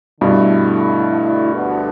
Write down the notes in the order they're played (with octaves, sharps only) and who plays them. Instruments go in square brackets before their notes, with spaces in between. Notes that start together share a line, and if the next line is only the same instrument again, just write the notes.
[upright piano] G2 B2 [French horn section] D3 A3 E4
[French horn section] D2 D3 B3 D4 A4